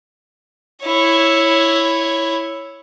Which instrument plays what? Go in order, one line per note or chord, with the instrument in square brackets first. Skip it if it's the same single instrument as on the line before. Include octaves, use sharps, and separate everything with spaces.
[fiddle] E4 C#5